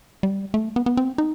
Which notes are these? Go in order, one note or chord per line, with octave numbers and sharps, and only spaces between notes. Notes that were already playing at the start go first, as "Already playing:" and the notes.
G3
A3
B3
B3
C4
D#4